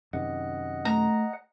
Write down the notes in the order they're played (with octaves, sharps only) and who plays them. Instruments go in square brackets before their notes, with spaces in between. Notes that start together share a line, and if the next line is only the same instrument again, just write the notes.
[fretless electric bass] F#2 C3 D#3 [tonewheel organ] D#5 F#5
[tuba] A3 [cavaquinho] A#5